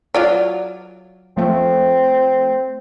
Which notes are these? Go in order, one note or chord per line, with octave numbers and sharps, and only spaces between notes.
F#3 F4 D5
F3 A3 C4